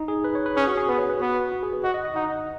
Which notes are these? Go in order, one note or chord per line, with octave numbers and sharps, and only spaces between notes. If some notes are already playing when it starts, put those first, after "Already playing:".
Already playing: D#4
G#4
B4
C#5
B4
C#4 G#4
F#4
G#4
B3 B4
C#5
B4
B3 F#4
F#4
G#4
B4
F#4 D#5
D#5
D#5
D#4 F#5